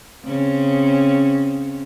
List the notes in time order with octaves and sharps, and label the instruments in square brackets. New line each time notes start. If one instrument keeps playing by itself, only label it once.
[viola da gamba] C#3 C4 C#4